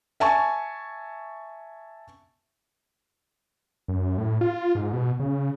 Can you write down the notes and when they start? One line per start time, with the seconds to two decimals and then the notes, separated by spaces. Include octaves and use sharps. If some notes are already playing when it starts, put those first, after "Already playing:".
0.20 E5 G#5 A5 C#6
3.88 F#2
4.18 A2
4.41 F4
4.75 G#2
4.93 B2
5.20 C#3